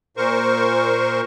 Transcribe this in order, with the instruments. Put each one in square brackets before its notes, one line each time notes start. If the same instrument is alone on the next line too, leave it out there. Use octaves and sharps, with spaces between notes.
[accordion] A#2 A#4 C5 C#6